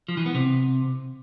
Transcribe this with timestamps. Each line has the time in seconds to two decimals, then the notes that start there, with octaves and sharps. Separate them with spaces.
0.08 F3
0.17 E3
0.26 B3
0.35 C3